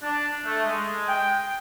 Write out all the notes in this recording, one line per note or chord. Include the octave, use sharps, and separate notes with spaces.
D4
A3
G#3
G5